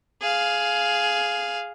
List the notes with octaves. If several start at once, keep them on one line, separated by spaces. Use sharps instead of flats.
G#4 F5